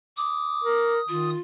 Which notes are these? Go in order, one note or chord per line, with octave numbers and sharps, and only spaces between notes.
D6 D#6
A#4
D#3 F4